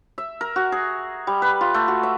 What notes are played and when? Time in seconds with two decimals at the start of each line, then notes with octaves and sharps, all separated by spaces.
0.18 E5
0.41 A#4
0.56 F#4
0.72 G#4
1.27 G3
1.42 B4
1.61 F4
1.74 A3
1.88 F#4
2.03 E5